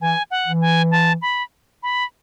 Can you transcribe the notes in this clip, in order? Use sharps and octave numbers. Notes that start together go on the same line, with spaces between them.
E3 G#5
F#5
E3
G#5
A5
B5
B5